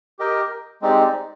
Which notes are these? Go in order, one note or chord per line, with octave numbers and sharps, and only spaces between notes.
G4 A#4 D#5 G5
G#3 C4 D#4 G4 D5